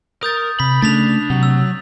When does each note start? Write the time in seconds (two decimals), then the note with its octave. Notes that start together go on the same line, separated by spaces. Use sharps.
0.23 A#4 D#6 G6 A6
0.60 C3 B5 B6
0.82 C#3 A3 D4 A6 B6 F7
1.30 C3 F#3
1.43 E6